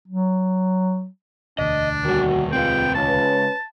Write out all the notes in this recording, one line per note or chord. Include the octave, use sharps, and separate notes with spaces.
F#3
E1 D2 D4 D#5
D#3 G3 F#4
G3 G#3 C4 F4 B4 G5
C#2 C#4 B4 A5